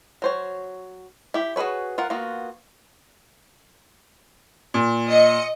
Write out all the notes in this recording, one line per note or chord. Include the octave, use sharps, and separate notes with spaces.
F#3 C5 C#5
E4 G4
F#4 G#4 A4 B4 C#5
F4 A#4 F#5
A#3 B3 F4 F#4
A#2
D#5 C#7